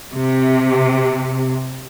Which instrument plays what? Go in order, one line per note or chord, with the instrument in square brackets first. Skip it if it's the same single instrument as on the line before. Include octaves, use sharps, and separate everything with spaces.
[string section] C3